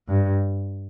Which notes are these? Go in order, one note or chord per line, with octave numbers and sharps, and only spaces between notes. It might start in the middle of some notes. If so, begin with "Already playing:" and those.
G2